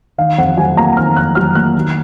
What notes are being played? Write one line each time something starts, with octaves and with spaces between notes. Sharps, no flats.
D#3 F5
F2 F#5
F#3 G#5
A#3 A#5
D#3 F6
F2 F#6
F#3 F6
A#3 F#6
D#3